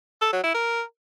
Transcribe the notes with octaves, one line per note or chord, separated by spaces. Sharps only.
A4
F#3
E4
A#4